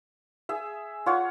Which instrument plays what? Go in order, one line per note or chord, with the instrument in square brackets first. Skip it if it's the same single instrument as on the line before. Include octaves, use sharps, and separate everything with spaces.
[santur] G#4 E5
F4 C#5 F#5